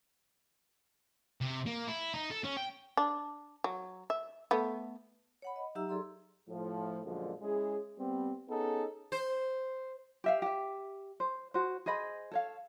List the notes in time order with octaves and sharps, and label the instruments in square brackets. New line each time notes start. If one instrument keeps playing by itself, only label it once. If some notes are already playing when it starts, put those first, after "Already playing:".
[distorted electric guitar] C3
A#3
E4
D#4
A4
C#4
G5
[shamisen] D4
F#3
E5
A3 B3
[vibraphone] C#5 F#5 B5
D#5
F#3 D#4 G4 E5 A#5 E6
G#4 A4 D5 C6
[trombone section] A2 F3
F#2 A#2 D3 F3 G#3
G#3 C#4 E4 G#4
G3 B3 C4
B3 C#4 D#4 G#4 A4
[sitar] C5
[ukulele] G4 E5 F5
G4 E5
C5
F#4 C5
G#4 C5 D#5 B5
A4 C#5 F5